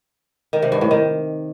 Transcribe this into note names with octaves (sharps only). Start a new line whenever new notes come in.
D#3
C3
G2
A2
D#3